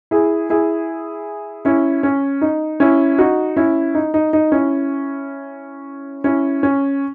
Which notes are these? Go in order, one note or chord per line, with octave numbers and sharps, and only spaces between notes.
E4 G#4
E4 G#4
C#4 E4
C#4
D#4
C#4 E4
D#4 F#4
C#4 E4
D#4
D#4
D#4
C#4 E4
C#4 E4
C#4